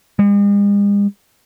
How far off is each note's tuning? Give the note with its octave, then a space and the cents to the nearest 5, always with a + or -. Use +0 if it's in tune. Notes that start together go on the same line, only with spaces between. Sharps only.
G#3 -45